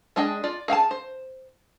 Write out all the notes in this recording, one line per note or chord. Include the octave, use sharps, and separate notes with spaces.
G#3 D4 G#4 D#5 G5
F4 D5
G#4 F5 G5 A5
C5